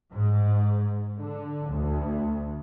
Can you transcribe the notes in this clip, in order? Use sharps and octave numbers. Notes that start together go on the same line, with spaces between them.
G#2
D3
D2